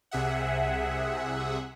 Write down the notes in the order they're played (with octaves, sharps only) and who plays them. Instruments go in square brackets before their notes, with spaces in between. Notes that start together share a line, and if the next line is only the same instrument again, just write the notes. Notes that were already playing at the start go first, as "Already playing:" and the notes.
[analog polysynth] C2 C3 G#4 E5 F#5